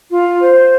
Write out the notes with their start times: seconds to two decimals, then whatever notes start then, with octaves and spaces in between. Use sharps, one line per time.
0.11 F4
0.41 C5